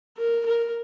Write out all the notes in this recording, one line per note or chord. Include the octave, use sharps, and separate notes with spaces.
A#4
A#4